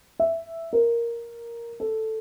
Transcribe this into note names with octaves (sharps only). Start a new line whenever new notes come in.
E5
A#4
A4